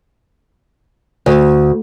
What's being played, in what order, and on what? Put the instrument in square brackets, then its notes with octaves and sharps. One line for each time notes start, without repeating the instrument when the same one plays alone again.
[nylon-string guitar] D2